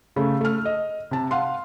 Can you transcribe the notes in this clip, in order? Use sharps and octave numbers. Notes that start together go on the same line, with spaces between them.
C#3 A3
A3 F6
D#5
C3 A5
F5 F#5 C6